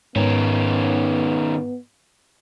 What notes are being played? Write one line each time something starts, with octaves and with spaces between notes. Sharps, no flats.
G#2 D#3 B3 C#4